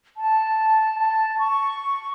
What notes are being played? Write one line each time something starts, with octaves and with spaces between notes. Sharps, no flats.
A5
A5
C#6